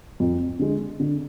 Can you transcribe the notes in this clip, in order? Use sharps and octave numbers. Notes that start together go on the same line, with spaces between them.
F2
D3 G#3
D3